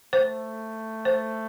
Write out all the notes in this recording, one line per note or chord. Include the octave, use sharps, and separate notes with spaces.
A3 C5
C5